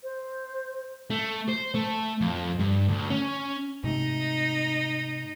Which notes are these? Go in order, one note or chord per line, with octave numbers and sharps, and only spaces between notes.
C5
A3
C5
A3
F2
G2
D2
C#4
G#2 C3 A3 D#4